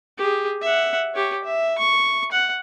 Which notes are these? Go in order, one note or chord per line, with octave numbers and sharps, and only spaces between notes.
G4 G#4
E5 F#5
G4 C#5
E5
C#6
F#5